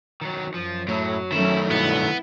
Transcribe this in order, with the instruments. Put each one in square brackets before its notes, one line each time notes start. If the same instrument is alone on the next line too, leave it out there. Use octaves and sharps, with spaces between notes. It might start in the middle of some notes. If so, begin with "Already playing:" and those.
[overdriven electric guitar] D#3 F#3
[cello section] F#2 [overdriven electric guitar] F3
[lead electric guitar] A2 [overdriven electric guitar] F#3
[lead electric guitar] D#3 A3 [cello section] F#3 C#4 [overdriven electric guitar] E4
[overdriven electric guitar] B1 G2 [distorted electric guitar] B3 [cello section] E4